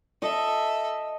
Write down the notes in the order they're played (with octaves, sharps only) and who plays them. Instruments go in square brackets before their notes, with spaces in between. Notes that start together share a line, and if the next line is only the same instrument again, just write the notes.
[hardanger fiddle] A4 E5 [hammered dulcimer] D#5